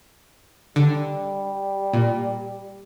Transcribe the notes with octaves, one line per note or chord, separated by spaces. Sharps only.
D3 G3
A#2